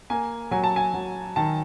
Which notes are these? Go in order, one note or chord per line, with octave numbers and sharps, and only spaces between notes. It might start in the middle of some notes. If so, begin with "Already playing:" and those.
A#3 G#5
F#3 G#5
A5
G#5
F#3
D#3 A5